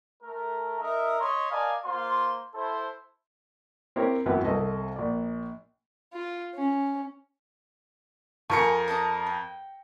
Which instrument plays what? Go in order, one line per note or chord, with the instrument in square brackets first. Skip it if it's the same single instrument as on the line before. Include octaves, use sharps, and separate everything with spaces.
[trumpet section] A3 A#4
D#4 A#4 D#5 E5
C#5 D#5 B5 C6
A#4 D5 D#5 F5 G#5 A5
A#3 F4 C5 C6
E4 A4 C5
[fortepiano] C4 E4 G4 A#4 C#5
G#1 F#2 A2 E3 B3
C2 A4 D#5
A#1 D5
[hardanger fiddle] F4
C#4
[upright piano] F2 A#4 C#7 [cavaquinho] G#5 C#6
[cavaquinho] D#5 A5 A#5
G5